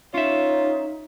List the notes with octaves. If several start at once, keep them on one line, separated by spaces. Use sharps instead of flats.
C#4 D#4 F4 C#5 E5